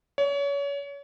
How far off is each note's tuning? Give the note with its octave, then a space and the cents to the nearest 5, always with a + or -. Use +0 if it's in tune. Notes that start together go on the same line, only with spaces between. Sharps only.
C#5 +30